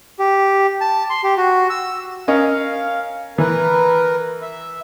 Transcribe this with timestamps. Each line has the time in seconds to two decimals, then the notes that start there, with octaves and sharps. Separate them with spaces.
0.19 G4
0.81 A5
1.10 C6
1.24 G4
1.37 F#4
1.70 E6
2.28 C#4 A#4 D#5 F5
3.38 E3 A#4 B4
4.42 E5